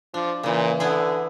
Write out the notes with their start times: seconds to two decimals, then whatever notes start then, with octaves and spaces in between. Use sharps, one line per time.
0.14 F3 D4
0.43 A#2 C#3 E3
0.80 D3 B3 E4 G#4